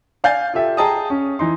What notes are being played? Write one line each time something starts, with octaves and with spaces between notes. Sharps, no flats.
D5 F5 G#5 G6 A6
F4 G4 A4 E5 G5
G#4 D#5 G5 A5 A#5 D#6
C#4
E3 D#4 C6